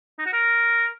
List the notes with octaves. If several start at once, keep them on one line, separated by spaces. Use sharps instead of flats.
D#4
F#4
A#4